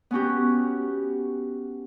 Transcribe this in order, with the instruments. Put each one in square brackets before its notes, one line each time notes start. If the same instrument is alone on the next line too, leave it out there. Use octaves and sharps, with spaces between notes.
[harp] B3 C#4 F#4 G4